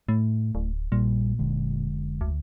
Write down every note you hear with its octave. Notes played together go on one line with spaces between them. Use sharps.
A2 A3
D1
A#1 A#2 G3
F1 D3 G#3
D2